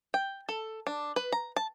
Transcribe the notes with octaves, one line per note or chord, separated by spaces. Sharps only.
G5
A4
D4
B4
A#5
A5